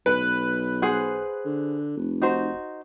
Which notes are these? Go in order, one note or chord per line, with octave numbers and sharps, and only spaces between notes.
B1 B4
G#4 C5 F#5
D3
F1
D#4 F#4 C5